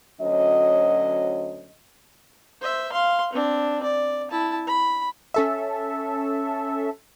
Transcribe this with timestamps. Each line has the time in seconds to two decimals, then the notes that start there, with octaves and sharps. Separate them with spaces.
0.21 D2 F#3 C#4 D#5
2.61 C5 E5
2.92 F5 C6
3.33 C4 D4
3.83 D5
4.31 E4 A5
4.67 B5
5.34 C#4 A4 E5